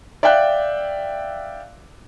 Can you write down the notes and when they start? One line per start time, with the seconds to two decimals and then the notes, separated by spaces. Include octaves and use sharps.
0.23 D5 E5 F5 G5 F#6